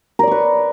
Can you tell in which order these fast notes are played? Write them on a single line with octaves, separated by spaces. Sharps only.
A#4 D5 C#6 B4